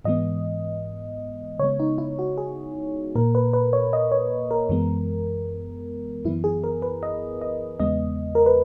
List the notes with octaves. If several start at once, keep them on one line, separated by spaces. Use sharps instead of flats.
G#2 E3 G#3 B3 D#5
C#3 G#3 B3 C#5
D#4
E4
F#4
G#4
A#2 A#3 A#4
B4
B4
C#5
D#5
C#5
A#4
F#2 E3 G#3 B3
F#2 E3 B3 E4
G#4
A#4
B4
D#5
D#5
E2 C#3 G#3 B3 D#5
A#4
B4